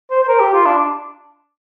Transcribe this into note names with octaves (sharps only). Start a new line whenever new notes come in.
C5
C5
A#4
G4
F4
D4